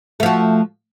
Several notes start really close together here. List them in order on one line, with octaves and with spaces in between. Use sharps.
A3 F3 F#4